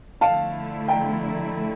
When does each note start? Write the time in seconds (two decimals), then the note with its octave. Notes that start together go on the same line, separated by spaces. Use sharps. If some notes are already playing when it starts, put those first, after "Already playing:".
0.21 D3 F3 A3 E4 F5 A5
0.88 G5 A#5